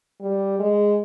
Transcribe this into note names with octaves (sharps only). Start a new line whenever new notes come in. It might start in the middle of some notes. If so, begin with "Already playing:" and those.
G3
G#3